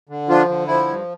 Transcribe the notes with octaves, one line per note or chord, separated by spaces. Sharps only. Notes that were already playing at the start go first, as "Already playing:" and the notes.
D3
F3 D4 F4
D3
F3 E4
G2